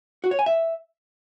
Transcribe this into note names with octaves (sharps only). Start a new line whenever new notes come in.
F#4
C#5
G#5
E5